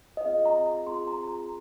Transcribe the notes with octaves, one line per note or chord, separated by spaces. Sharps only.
D#5
C4 F4 G#4 F5
A#5
A#5
C4 F4 G#4 C6
A#5
A#5